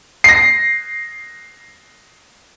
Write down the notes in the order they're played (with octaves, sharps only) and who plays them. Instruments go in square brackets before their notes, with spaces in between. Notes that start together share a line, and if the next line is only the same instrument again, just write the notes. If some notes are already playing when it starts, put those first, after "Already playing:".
[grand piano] A#6 C7